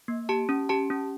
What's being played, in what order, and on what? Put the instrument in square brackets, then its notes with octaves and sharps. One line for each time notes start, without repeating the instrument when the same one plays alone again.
[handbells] A#3
G4 A5
C#4
G4 A5
C#4